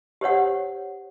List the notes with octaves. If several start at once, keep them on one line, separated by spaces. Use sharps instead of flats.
G4 C5 C#5 F#5